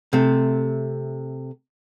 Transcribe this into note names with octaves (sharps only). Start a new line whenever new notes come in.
C3 A3